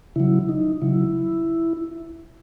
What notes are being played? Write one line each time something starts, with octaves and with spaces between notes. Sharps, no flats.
C#3 F#3 E4
D#4
C#3 F#3 E4